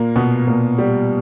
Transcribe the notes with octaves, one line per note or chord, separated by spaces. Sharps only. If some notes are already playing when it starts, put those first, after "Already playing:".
Already playing: A#2 A#3
B2 B3
A#2 A#3
G3